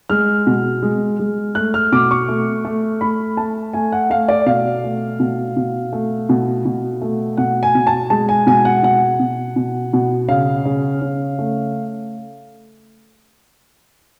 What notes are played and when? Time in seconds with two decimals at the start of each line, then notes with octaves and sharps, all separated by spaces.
0.10 G#3 F6
0.47 B2
0.83 G#3
1.19 G#3
1.55 A3 F#6
1.74 F6
1.92 B2 D6
2.11 C#6
2.29 A3
2.65 A3
3.01 A3 B5
3.37 A3 A5
3.73 A3 G#5
3.92 F#5
4.10 A3 F5
4.28 D5
4.46 B2 F5
4.84 A3
5.20 B2
5.57 B2
5.93 A3
6.29 B2
6.65 B2
7.02 A3
7.37 B2 F#5
7.63 G#5
7.75 B2
7.87 A5
8.10 G#3 A5
8.29 G#5
8.47 B2 G#5
8.65 F#5
8.83 B2 F#5
9.20 B2
9.56 B2
9.93 B2
10.29 C#3 F5
10.65 C#3
11.02 C#3
11.39 A3